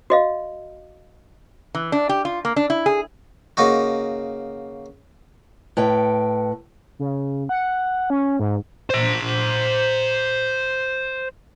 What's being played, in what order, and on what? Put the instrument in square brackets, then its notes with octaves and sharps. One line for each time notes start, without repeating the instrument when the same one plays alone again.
[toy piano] F#4 D#5 F5
[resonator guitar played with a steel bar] E3
D4
G4
F4
A#3
D4
E4
G#4
[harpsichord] C#3 A#3 D#4 F#4
[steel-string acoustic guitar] A2 B4 G5
[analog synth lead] C#3
F#5
C#4
G#2
[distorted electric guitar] C5 A#5